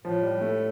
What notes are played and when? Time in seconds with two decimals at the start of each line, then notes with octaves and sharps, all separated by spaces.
0.04 A2 F3
0.23 G3
0.41 A3